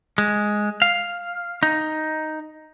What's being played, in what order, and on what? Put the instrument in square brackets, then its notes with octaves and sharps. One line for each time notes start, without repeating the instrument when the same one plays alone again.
[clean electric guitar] G#3
F5
D#4